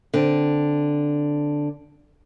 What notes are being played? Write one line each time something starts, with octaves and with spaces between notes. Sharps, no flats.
D3 C4